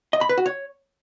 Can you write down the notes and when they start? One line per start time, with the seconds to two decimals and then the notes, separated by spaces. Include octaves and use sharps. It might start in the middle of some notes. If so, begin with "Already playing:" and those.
0.13 D#5
0.21 B5
0.29 B4
0.37 F#4
0.46 C#5